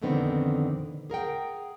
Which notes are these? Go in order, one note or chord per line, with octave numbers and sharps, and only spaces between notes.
F2 A#2 D3 D#3 B3 C4
G#4 A#4 F#5 G5